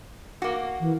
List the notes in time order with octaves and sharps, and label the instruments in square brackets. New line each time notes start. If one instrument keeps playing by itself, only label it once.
[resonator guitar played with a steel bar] A#3 F#4
[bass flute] E3